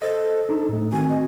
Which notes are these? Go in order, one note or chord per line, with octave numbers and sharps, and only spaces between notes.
A4 C5 D#5
D4 D#4
A2 A3
D#3 C4 F#4 G#5
D#5